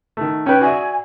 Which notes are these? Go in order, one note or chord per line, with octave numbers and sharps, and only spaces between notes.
D#3 A3
C#4 B4 G5
F#4 D5 E5 G#5